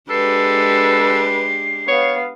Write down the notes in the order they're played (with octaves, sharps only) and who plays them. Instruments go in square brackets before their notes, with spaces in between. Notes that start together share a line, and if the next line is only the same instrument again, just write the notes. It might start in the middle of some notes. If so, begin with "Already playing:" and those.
[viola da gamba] G#3 D4 G4 [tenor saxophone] A4 [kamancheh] B4 [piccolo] C7
[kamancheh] B3 F5 [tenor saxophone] C#5